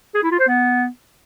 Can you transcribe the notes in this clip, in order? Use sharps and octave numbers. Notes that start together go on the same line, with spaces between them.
G#4
E4
F4
C5
B3